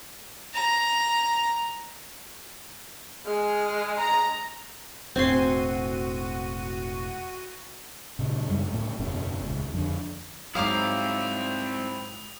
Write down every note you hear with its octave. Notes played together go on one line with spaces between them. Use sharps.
A#5
G#3 G#4 F6
A#5
E1 A2 C4 F#4 G#5 C6 D#7
A#2 C#3
F#2 C#3 G3 G#3
D2 A2 A#3
F#1 E2 B2 C#4
D#1 C#2
F2 D3
G#2 F#3 C4 E4 F5 A#5 D6 D#6